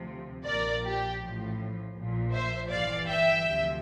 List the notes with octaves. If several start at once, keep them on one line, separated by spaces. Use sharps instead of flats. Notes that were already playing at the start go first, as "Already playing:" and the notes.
Already playing: D2 C3 F3
A#1 A#2 F3 A#4 D5
G4
A1 A2 F3
A#1 A#2 F3
C5 E5
G1 G2 E3 D5 F5
E5 G5
D2 C3 F3